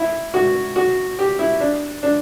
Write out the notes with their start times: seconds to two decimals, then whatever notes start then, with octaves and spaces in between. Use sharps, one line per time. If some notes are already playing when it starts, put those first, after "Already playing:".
Already playing: E4
0.34 F#4
0.76 F#4
1.19 G4
1.39 E4
1.60 D4
2.03 D4